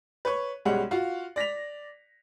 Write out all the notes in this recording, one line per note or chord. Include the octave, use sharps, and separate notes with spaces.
B4 C#5 C#6
B1 G3 G#3 C#4 F#5
F4 F#4 F5
D5 A#6 B6 F7